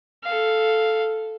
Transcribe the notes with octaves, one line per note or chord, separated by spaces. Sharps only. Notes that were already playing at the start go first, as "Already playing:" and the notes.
A4 F5